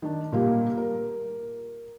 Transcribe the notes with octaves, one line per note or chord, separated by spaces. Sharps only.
D#3 D4
A#2 G3 A#3 F4 G4
A#4